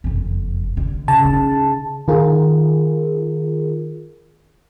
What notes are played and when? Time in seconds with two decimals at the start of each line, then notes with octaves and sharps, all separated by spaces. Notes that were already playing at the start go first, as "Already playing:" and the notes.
0.04 F#1 F2
0.77 D3
1.08 C#3 A5
1.25 D#4
2.08 D#3 F4 G#4 A#4